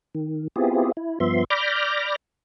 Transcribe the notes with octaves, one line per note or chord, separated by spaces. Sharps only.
D#3
B3 C4 E4 F4 G4 G#4
E4
G2 F3 B3 E5 C6
D5 B5 D6 F6 G6 A#6